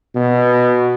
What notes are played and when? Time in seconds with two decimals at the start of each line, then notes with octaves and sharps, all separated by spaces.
0.15 B2